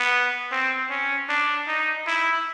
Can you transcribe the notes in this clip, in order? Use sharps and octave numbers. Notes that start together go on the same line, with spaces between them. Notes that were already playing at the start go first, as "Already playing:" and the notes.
Already playing: B3
C4
C#4
D4
D#4
E4